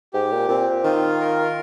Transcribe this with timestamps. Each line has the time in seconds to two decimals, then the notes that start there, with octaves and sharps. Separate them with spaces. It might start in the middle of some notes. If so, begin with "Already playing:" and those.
0.13 G#2 G4
0.32 A#2
0.49 A#2 C4
0.84 D#3 F4
1.20 A#4